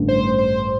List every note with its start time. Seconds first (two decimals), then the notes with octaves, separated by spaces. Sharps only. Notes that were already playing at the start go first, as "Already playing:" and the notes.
Already playing: A1 G2 D3
0.08 C5
0.38 C5